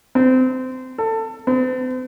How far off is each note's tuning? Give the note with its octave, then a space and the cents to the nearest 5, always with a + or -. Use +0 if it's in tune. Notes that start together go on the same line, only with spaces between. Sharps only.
C4 -25
A4 +25
C4 -45